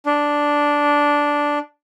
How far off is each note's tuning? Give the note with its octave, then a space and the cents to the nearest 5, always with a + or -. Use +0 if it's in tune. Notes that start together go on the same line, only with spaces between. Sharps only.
D4 -5